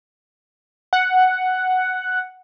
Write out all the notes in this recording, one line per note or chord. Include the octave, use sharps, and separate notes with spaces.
F#5